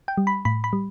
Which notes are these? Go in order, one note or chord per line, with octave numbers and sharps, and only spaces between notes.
G5
G3
B5
A2 B5
B5
G3